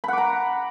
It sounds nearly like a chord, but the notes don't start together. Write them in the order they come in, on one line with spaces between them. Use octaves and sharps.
B5 F#5 D6 A#5